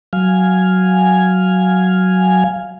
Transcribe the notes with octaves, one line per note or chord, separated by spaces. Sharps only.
F#3 F5 G#5